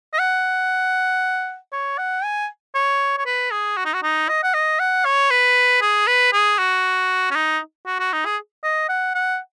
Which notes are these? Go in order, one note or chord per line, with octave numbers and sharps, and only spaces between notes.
D#5
F#5
C#5
F#5
G#5
C#5
C#5
B4
G#4
F#4
D#4
F#4
D#4
D#5
F#5
D#5
F#5
C#5
B4
G#4
B4
G#4
F#4
C#4
D#4
F#4
F#4
D#4
G#4
D#5
F#5
F#5